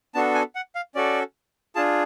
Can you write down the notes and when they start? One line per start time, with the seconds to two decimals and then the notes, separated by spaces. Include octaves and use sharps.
0.14 B3 D4 F#4 A4 A5
0.35 G#5
0.55 F#5
0.75 F5
0.95 C#4 F#4 A4 D5
1.75 D4 F4 G#4 A5